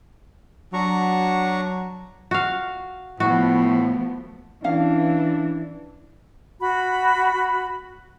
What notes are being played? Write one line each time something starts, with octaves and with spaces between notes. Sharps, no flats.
F#3 D4 A#5 C#6
F#4 F5
A2 F3 A3 B3 F#4
E3 C#4 D4 F5
F#4 B5